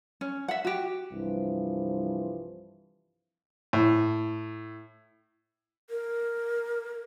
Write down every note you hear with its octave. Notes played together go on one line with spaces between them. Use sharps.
C#4
E5 F#5
F#4 G4
C2 G2 E3 F3
A2
A#4